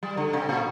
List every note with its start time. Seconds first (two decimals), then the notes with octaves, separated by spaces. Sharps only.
0.03 G3
0.17 D3
0.33 C3
0.49 A#2